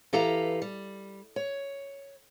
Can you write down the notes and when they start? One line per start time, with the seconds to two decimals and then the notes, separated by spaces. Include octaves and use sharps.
0.13 E3 G4 A4 B4 F5 A#5
0.62 G3
1.36 C#5